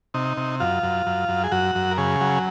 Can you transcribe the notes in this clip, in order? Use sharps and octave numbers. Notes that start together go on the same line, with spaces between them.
C3 D#4
C3
F#2 F4
F#2
F#2
F#2
G#4
F#2 F#4
F#2
A#4
C#3 G#4
F#3